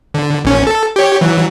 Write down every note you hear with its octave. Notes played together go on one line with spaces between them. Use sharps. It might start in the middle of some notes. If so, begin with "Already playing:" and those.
D3
A#1 C#4
A4
G4 C#5
E3 F#3